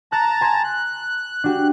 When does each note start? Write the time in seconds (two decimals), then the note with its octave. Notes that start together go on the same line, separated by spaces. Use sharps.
0.12 A5 A#5 F#6 C#7
0.41 G#5 C6 G#6
0.64 F#6
1.44 D4 F#4 G4